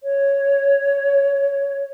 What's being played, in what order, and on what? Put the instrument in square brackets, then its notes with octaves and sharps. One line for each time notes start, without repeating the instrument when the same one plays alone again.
[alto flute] C#5